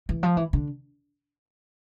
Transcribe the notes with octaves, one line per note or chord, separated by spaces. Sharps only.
E3
F3
E3
D3